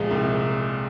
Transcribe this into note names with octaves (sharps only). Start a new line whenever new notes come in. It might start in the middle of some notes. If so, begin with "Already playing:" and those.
Already playing: C2 A#2 F3 G#3
C2